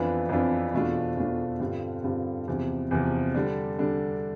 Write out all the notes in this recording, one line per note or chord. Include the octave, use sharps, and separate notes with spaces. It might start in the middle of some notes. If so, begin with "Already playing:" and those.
Already playing: F2 E3 B3 D4 F4
F2 E3 B3 D4 F4
E2 B2 A3 D4 F4
E2 B2 A3 D4 F4
G2 D3 G3 C4 F4
G2 D3 G3 C4 F4
E2 C3 F3
E2 C3 F3
D3 G3 D4
D3 G3 D4